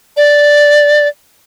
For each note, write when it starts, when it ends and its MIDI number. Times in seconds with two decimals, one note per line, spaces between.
0.17 1.08 74